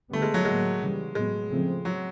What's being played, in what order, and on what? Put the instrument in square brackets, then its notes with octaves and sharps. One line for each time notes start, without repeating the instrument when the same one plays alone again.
[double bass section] D3 G3 B3 [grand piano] A3
[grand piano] G#3
F#3
[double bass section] A2 F#3 A#3 [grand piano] G#3
[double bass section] C#3 E3 G3
[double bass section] A2 F#3 B3 [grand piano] G#3
[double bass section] C#3 F3 A3 C4
[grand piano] F#3